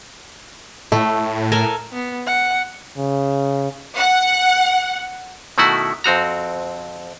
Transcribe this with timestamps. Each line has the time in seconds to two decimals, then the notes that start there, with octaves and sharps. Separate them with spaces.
0.92 A2 A3
1.52 A4 A#4 G#5
1.92 B3
2.26 F#5
2.98 C#3
3.98 F#5
5.58 B2 D#3 A3 E4 F#4 F#5
6.04 F2 C4 F#4 A#5